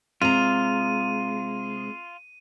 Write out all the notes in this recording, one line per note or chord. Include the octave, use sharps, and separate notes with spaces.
C3 G#3 F4 A#5 D#7